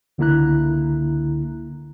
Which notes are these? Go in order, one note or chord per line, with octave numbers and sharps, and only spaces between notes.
C#2 D3 A#3 E4 A#5 F#6